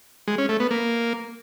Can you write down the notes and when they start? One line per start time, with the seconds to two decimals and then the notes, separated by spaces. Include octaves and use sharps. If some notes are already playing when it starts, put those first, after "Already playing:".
0.28 G#3
0.38 C#4
0.49 A3
0.60 B3
0.71 A#3